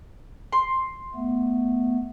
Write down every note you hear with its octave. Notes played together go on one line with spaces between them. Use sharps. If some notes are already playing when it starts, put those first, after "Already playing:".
C6
A3 B3